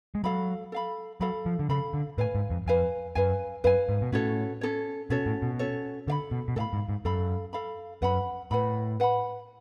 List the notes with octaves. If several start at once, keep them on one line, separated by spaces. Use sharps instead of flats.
G#3
F#3 A4 F5 B5
A4 F5 B5
F#3 A4 F5 B5
F3
D3
C#3 A4 F5 B5
D3
A2 B4 F5 G#5
G#2
F2
F2 B4 F5 G#5
F#2 B4 F5 G#5
F#2 B4 F5 G#5
G#2
B2
A2 C#4 F#4 A4 C#5
C#4 F#4 A4 C#5
B2 C#4 F#4 A4 C#5
A2
B2
C#4 F#4 A4 C#5
D3 A4 F5 B5
B2
B2
A2 A4 F5 B5
G#2
G#2
F#2 A4 F5 B5
A4 F5 B5
F#2 B4 F#5 B5
A2 B4 F#5 B5
B4 F#5 B5